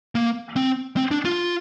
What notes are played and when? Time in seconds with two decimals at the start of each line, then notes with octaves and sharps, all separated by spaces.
0.15 A#3
0.56 C4
0.97 C4
1.11 D4
1.25 F4